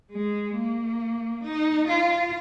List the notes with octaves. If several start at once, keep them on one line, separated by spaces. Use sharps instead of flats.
G#3
A#3
D#4
F4